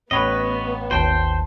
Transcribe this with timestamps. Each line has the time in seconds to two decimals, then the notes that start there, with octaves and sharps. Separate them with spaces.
0.11 A1 B3 B4 C#5 D#5 B5
0.91 G#1 D#2 C5 G5 A5